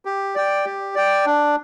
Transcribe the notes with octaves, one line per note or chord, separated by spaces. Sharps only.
G4
D5 G5
G4
D5 G5
D4